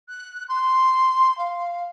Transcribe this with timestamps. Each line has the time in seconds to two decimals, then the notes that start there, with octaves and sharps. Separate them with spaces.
0.09 F#6
0.48 C6
1.38 F5